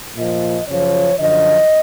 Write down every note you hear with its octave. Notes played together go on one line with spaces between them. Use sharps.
A#2 F3 D#5
F#2 C#3 F3 C#5
F#2 D3 F3 D#5